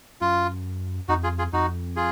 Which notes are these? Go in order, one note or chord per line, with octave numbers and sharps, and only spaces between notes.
F#2 F4
F2 D#4 F#4
F4 G#4
F4 G#4
F2 D#4 F#4
F4 G#4